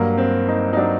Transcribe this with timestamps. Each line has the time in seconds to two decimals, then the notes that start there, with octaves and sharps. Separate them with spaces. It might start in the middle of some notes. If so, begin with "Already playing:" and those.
Already playing: G2 F#3 A#3
0.18 C4
0.48 D#4
0.73 D#4
0.77 F#3 D4